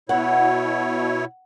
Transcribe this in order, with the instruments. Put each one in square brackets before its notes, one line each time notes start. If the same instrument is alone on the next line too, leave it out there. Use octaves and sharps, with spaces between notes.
[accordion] B2 E4 C#5 [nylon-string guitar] F#5